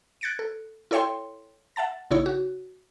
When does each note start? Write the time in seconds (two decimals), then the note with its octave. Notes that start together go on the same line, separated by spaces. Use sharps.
0.21 F#6 G#6 A6 C#7 D7
0.39 A4
0.91 E4 A4 C#5 E5 G5 C6
1.76 E5 F#5 A5 A6
2.11 A#1 C#3 D#4 E4 C#5
2.26 F#4